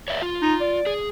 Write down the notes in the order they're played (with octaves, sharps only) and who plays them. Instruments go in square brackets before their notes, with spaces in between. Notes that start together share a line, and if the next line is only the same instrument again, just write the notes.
[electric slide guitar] C#5 D5 E5
F4
[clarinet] D#4
D5
[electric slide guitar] G#4